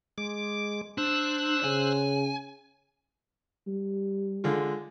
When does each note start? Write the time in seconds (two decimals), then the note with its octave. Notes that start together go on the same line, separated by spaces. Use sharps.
0.18 G#3 D6
0.98 D4 C5 E6 F#6
1.64 C#3 G#5
3.67 G3
4.44 D3 G#3 F4